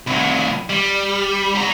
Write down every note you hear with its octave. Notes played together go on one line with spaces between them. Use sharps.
C2 A2
G3
G3 A#5